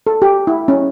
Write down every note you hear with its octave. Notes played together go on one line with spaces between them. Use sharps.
A4
G4
E4
C#4